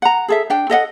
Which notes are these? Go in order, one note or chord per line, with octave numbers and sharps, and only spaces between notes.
F#5 A#5
G#4 A4 E5
D4 G5
A4 D#5 E5 F#5